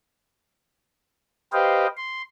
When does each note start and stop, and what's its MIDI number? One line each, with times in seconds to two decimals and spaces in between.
1.53 1.87 67
1.53 1.87 71
1.53 1.87 72
1.53 1.87 75
1.53 1.87 77
1.53 1.87 79
1.97 2.22 84